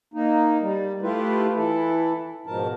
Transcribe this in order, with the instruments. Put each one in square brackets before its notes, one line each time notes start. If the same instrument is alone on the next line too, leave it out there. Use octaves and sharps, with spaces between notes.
[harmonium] A#3 D#4
G3
A3 E4 F4 G4 B4
E3 E4 A4
G#2 B2 F3 A#4 A5